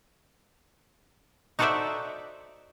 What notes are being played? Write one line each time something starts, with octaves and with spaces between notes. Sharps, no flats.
D#4 F#4 A4 C5 D5 E5